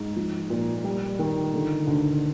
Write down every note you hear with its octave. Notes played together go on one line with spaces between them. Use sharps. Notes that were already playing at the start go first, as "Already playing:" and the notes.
Already playing: G#2
F3
A#2
G3
D#3
D3
D2